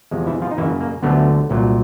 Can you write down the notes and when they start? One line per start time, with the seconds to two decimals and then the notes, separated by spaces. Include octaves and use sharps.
0.11 E2 C3 F3 G#3
0.27 E3 E4
0.42 F3 F4
0.51 D#4
0.58 F#2 C#3 E3 F#3 A#3 E4
0.81 A#3
1.03 D2 D3 F#3 A3 B3
1.49 C2 A#2 F#3